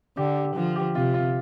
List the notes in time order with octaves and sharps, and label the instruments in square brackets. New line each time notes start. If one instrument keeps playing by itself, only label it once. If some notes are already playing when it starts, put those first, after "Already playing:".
[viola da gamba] D3 [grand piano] G4
[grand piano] G4
[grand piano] D3 [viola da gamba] F3
[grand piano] G4
[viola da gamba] C3 [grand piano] F4
[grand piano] F4